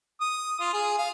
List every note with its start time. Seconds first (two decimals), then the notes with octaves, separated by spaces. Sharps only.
0.21 D#6
0.60 F4
0.73 G#4
0.98 F5